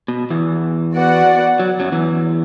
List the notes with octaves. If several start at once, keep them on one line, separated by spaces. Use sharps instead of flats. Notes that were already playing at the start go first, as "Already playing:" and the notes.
B2
E2 E3
B3 F#4 D5 F#5
F#3
F#2 F#3
E2 E3